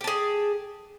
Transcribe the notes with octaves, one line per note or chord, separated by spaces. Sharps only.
G4 G#4 A5